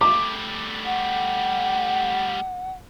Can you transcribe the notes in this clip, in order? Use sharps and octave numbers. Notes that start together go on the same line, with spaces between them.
G3 A3 D6
F#5